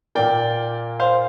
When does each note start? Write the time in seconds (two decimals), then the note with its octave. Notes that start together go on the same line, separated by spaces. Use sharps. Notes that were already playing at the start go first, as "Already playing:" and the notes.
0.15 A#2 A#3 D5 G5
1.00 C5 F5